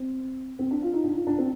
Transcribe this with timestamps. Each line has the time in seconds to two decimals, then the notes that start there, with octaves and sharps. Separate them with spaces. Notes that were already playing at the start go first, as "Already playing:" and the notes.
Already playing: C4
0.59 C4
0.71 D4
0.82 F4
0.93 D#4
1.04 D4
1.16 F4
1.27 D4
1.38 C4